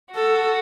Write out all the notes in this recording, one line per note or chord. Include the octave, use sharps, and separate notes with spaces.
F#4 A4